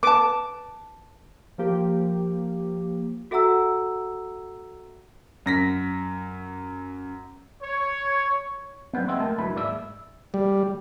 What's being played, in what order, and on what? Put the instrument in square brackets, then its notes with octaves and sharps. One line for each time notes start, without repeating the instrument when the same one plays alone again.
[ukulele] B4 A5 [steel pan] D6
[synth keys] F3 A#3 G4
[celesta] F#4 A4 E5 F#5 A#5 E6
[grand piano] F#2 A#6 B6
[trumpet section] C#5
[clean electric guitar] F#3 G3 B3 C4
D#2 G4 D#5 E5 C6
G#3 A3 A#4 A5
D2 G2 F#3 E4 B4 B5
D#2 G#2 G#3 D5 E5
[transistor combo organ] G3